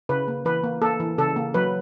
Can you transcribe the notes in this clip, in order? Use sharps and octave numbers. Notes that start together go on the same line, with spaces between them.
C#3 B4
A#3
E3 B4
A#3
A#3 A4
E3
C#3 A4
A#3
F#3 B4